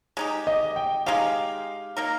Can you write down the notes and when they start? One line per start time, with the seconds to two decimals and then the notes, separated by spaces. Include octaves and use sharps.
0.17 G#3 D#4 G4
0.47 D#5
0.76 G5
1.06 G#3 D#4 G4 F5
1.97 A#3 D#4 A#4